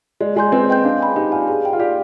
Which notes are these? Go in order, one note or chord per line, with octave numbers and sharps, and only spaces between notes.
G#3 D5
G#3 G#5 C6 G6
C4 B4
D#5 G5 C6 G6
D4 F5
G#5 B5
D#4 G4
F4 D5 G#5
G#4
D5 G5
F4
G4 D5